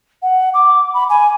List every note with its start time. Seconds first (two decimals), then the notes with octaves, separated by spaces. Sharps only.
0.22 F#5
0.53 D6
0.93 B5
1.09 G#5